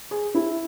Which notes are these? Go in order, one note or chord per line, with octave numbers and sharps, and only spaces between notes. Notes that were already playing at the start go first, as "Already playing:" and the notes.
G#4
E4